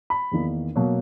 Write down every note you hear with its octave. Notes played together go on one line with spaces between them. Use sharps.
B5
E2 D#3 A#3 D#4
B2 F#3 A#3